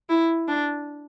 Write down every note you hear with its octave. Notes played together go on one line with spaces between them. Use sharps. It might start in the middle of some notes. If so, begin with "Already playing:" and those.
E4
D4